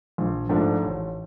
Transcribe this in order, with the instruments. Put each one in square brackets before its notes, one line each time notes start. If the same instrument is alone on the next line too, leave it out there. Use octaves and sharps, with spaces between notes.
[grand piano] A#1
G#2 F3 A3 D4
A1